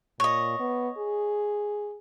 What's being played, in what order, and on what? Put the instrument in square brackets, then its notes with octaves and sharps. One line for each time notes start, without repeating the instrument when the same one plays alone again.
[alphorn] A#2 [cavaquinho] C#5 D#5
[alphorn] B3
G#4